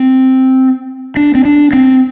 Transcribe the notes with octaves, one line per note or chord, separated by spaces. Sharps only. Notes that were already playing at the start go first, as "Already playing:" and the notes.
Already playing: C4
D4
C4
D4
C4